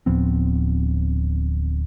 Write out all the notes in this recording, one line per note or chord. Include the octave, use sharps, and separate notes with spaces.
D1 F3 B3 C4